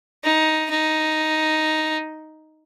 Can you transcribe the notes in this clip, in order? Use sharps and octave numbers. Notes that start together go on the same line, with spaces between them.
D#4
D#4